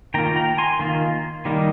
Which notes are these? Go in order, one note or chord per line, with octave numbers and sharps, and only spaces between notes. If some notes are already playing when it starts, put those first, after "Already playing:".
D#3 A#3 F4 G5 A#5
G5 A#5
G#5 C6
D#3 A#3 F4
D#3 G3 A#3 D#4